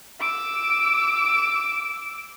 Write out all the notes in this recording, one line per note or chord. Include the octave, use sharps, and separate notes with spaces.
D6 E6